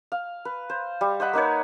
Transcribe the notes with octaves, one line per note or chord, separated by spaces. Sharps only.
F5
B4
C5
G3
C5 D#5 F#5 B5
A#3 D#4 B4 C#5